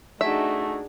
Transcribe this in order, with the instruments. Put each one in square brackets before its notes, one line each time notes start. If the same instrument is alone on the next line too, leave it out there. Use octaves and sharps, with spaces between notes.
[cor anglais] A3 [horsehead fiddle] D4 G#4 [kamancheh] D#4 F#4 [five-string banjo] E5